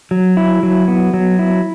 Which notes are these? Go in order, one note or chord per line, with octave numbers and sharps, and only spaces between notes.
F#3
E4
F#3
B3
F#3
E4